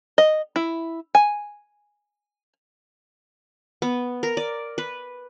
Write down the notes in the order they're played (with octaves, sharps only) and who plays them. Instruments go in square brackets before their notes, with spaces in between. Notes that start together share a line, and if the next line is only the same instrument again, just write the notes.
[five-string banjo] D#5
E4
G#5
[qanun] B3
A#4
D5
B4